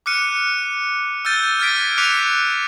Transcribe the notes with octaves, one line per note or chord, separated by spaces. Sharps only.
D6 F6 F#6 C#7 D#7
E6 F6 G6 A6 D#7
F6 G#6 A6 B6 D7
D6 F#6 B6 C#7 D#7 F7